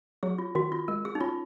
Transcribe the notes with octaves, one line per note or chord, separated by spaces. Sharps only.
F#3 G#4
F4
D#3 F#4
F4
G#3 A#4
G#4
D#4
C#4 F4